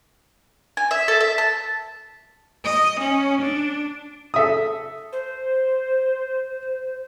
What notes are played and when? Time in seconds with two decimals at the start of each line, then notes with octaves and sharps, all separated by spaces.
0.77 G#5
0.91 E5
1.08 A4
1.20 E5
1.38 A5
2.65 D#5
3.00 C#4
3.41 D4
4.34 A4 E5 D#6
5.13 C5